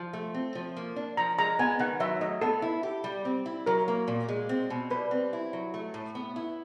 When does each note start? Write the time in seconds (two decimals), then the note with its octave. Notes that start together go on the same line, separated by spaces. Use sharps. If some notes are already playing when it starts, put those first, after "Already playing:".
Already playing: F3
0.13 A3
0.34 C4
0.55 F3
0.77 A#3
0.96 D4
1.17 F3 A#5
1.38 G#3 A#5
1.59 B3 G#5
1.79 D#3 F#5
2.00 F#3 E5
2.21 A3 D#5
2.42 B3 A4
2.62 E4
2.83 G4
3.04 G3
3.25 C4
3.46 E4
3.66 F#3 A#4
3.88 A#3
4.08 A#2
4.29 G#3
4.49 C4
4.70 B2
4.90 G3 B4
5.11 C4
5.33 E4
5.53 F#3
5.74 A3
5.94 A2
6.15 B3
6.36 E4